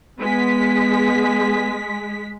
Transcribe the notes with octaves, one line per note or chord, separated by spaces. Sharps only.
G#3 B3 B6